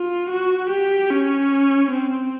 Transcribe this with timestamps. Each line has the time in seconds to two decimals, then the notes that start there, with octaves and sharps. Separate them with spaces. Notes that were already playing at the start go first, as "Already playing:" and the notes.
Already playing: F4
0.29 F#4
0.70 G4
1.10 C#4
1.91 C4